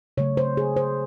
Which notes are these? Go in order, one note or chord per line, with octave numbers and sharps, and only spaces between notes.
C#3 F#3 A3 C#5
C5
G#4
C5